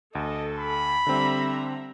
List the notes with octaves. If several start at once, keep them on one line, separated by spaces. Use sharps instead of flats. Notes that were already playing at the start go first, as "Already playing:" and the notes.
D2 A4 D#5
B5
D3 G3 C4 E5 A#5